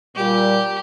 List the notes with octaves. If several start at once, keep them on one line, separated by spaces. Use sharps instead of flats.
A#2 G3 G4